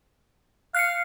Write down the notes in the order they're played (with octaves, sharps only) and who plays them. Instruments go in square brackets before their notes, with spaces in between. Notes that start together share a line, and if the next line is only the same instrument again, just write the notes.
[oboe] F5 [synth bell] F#6 C7 C#7